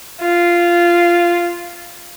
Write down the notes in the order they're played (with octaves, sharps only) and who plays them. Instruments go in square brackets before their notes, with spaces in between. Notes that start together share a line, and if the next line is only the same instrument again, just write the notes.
[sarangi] F4